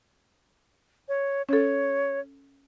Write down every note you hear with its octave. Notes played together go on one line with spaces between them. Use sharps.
C#5
C#4 A4 C#5